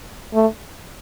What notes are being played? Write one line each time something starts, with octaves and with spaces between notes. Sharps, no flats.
A3